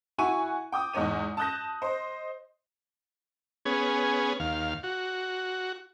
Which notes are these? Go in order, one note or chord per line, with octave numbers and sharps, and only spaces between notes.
E4 F#4 F#5 G#5 C#6 D#7
G5 D6 D#6
E2 G#2 D#4 C#5 D#7
A5 D#6 F#6 G6 A#6
C5 D#5
B3 C#4 G#4
D#2 F5
F#4